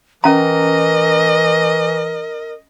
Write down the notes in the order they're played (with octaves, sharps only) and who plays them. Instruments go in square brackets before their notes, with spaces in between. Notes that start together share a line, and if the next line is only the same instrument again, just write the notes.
[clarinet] E3 [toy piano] C#4 A#5 [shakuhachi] A#4 [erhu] D#5